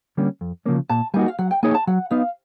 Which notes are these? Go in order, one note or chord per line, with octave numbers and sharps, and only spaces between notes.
D3 G3 A#3 C#4
F2
C#3 F3 A#3 C#4
A#2 A5
G3 A#3 D#4 F#4 G#5
F5
F#3 F#5
G5
A#3 D#4 G#4 C#5 G#5
A5
F#3 F#5
B3 D#4 F5